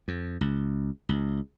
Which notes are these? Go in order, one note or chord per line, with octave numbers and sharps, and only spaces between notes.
F2
C#2
C#2